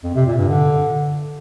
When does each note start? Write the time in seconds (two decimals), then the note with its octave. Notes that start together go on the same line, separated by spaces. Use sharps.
0.04 F2
0.15 C3
0.26 A#2
0.38 G2
0.49 D3